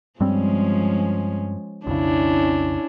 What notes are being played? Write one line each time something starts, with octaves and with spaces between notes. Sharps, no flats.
G2 F3 G3 G#3 C4 C#4
B1 F2 C#3 C#4 D4 E4